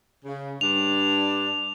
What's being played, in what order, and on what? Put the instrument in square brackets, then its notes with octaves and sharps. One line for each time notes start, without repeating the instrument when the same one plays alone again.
[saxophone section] C#3
[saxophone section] G2 D4 [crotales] F7